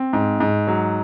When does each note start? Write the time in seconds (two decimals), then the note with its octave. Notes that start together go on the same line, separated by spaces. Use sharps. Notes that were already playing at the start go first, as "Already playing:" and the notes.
Already playing: C4
0.13 G#2
0.40 G#2
0.67 F#3